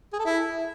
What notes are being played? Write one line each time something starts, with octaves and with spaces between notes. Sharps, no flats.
G#4
A4
E4